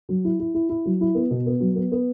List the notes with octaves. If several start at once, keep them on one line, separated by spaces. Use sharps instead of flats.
F#3
E4
E4
E4
E4
F#3
E4
B3
B2
B3
F#3
B3
B3